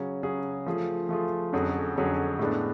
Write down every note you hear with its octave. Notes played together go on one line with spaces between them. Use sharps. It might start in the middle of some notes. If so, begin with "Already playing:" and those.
Already playing: C#3 F#3 C#4 G#4
C#3 F#3 C#4 G#4
F3 A3 F4 G#4
F3 A3 F4 G#4
F2 D3 F#3 C#4 G#4
F2 D3 F#3 C#4 G#4
A2 G#3 B3 D4